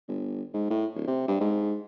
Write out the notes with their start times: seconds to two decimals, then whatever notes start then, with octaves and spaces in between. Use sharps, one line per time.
0.08 G1
0.54 G#2
0.70 A2
0.95 D1
1.07 C3
1.28 G2
1.40 G#2